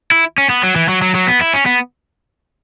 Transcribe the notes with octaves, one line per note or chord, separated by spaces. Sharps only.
E4
C#4
B3
F#3
E3
F#3
F#3
F#3
B3
E4
C#4
B3